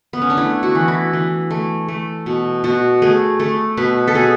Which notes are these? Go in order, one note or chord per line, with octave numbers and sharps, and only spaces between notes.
B3
C#4
D4
A3 E4
F#4
E3
E4
E3
A3
A3
B2
B2 F#4
A3 G#4
A3 A4
B2 B4
A4
B2 G#4